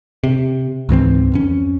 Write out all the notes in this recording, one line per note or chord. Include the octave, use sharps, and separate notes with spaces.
C3
C#2 G#2 E3 C4
F2 C#4